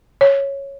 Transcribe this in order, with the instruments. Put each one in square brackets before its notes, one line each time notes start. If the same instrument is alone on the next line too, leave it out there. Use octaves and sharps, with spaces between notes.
[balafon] C#5